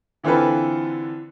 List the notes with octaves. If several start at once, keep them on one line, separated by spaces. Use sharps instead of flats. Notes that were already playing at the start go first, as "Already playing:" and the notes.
D3 E3 C4 F4 A4 B4